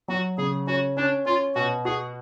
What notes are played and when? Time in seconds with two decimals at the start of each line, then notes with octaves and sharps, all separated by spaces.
0.08 F#3 F#4
0.38 C#3 G#4
0.67 C#4 F#4
0.97 C#4 D4
1.26 C#4 F4
1.55 B2 F#4
1.85 F#4 G#4